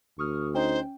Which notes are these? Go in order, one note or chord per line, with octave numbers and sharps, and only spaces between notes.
D2 C#6 D#6 F6
C#4 D#4 C5 G5